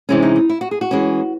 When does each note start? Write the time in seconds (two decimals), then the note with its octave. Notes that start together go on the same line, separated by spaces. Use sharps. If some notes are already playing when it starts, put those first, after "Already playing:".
0.09 C3 E3 G#3 C#4
0.22 D#4
0.36 D#4
0.49 E4
0.61 F#4
0.71 G#4
0.81 F#4
0.91 E3 G#3 C#4